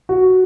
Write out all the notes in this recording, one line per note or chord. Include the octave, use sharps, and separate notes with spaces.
F#4